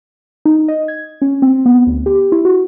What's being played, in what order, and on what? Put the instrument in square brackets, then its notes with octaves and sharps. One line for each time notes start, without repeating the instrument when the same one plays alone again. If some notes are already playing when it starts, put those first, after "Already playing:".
[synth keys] D#4
D#5
G#6
C#4
C4
B3
D2
G4
E4
F#4